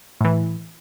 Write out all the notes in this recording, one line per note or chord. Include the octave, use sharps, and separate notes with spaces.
A2 E3